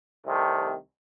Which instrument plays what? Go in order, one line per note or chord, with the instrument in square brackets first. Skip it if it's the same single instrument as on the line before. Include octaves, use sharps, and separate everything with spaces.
[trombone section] C2 C3 D#3 A3